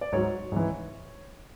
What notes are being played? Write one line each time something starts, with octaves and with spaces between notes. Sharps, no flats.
D5
G#2 F#3 C#5
G#2 E3